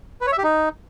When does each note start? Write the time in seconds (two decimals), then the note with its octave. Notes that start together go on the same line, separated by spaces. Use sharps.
0.21 B4
0.27 C#5
0.32 E5
0.38 G4
0.44 D#4